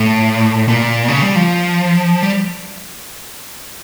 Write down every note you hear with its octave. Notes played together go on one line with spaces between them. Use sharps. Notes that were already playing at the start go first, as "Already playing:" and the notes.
Already playing: A2
A#2
C#3
G3
F3
G3